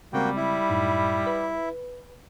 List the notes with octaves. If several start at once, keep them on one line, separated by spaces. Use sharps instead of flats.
C#3 G3 G#3 A#3 C4 F#4 G5
E4
F#2 A2 D#4
B4